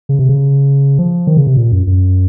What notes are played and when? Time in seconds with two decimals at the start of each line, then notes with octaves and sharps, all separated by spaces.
0.09 C#3
0.19 C3
0.29 C#3
0.98 F3
1.27 D#3
1.37 C#3
1.47 C3
1.57 A#2
1.72 F#2
1.87 F#2